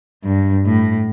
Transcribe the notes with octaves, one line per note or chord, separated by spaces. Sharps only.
G2
A2